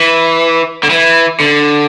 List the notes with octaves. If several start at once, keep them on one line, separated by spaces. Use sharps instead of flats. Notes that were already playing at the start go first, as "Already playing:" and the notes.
Already playing: E3
D3
E3
D3